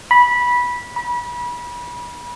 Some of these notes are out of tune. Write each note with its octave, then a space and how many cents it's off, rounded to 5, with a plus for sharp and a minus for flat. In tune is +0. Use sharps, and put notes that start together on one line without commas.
B5 -15
B5 -30